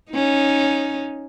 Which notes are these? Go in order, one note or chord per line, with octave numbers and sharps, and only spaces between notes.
C#4 D#4